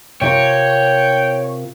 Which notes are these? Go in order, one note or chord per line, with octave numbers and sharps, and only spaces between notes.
C3 F4 A#4 C#5 G5